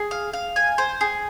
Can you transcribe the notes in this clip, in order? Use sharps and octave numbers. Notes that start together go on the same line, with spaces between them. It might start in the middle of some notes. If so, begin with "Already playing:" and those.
Already playing: G#4
F5
F5
G#5
C5
G#4